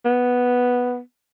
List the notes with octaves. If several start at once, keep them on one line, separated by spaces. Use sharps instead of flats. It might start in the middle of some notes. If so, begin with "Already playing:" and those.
B3